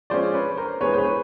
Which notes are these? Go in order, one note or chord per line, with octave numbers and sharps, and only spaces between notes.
F3 G#3 C#4 C5 D5
B4 C#5
A#4 C5
E3 G#3 B3 B4 C#5
C5
B4 C#5